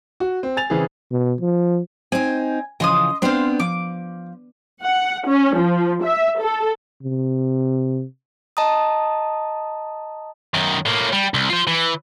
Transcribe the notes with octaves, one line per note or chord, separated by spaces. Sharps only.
F#4
C4
G#5 A6 F7
C#3 E3 C4 G#4
B2
F3
C4 D#4 G#5
C#3 E3 F3 D#5 C6 D#6
B3 C4 D4 C5 F5
F3 D6
F#5
C#4
F3
E5
A4
C3
D#5 A5 A#5 D#6
F#2 D#3
A2 A#3
G3
C2
F4 C5
E3